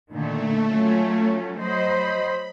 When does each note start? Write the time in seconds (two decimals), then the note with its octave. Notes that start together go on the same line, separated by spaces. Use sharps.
0.11 A#2 D3 D#3 A3
0.67 F#3 C#4 F4
1.57 F#3 C5 D#5 B5